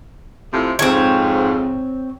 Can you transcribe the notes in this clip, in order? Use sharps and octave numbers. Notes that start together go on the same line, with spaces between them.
A2 C3 F3
F2 G#2 C4 C#5